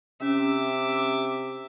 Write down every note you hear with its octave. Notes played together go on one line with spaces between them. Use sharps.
C3 C#4 E5 D6